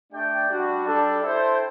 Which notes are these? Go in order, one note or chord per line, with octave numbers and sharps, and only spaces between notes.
A3 D4 G4 D5 G5
G3 D4 F#4
G3 D4 A4
E4 A4 C5 G5